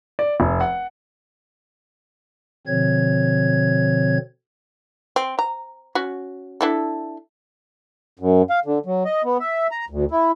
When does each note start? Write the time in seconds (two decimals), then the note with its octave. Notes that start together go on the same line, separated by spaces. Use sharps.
0.19 D5
0.40 F1
0.61 F#5
2.67 B2 D3 F3 C4 C#5 G#6
5.16 C4
5.39 A#5
5.95 C#4 F#4
6.61 D4 E4 A4
8.19 F#2
8.50 F5
8.66 D3
8.86 F#3
9.05 D#5
9.24 B3
9.40 E5
9.71 A#5
9.90 D2
10.11 E4